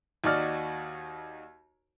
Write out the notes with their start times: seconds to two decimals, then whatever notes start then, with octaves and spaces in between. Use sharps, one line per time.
0.24 D#2 D#4 F#4 D5 F6